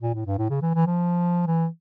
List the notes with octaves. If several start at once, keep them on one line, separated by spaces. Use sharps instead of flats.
A#2
A2
G2
A2
C#3
E3
E3
F3
E3